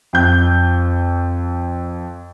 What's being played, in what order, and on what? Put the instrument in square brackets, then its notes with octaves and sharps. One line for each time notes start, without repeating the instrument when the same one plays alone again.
[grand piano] F2 G6